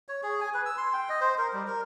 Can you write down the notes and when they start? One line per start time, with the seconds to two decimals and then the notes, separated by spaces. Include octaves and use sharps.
0.09 C#5
0.23 G#4
0.41 G#5
0.54 B4
0.66 E6
0.78 C6
0.93 G5
1.09 D#5
1.21 C5
1.38 A#4
1.53 G3
1.67 A#4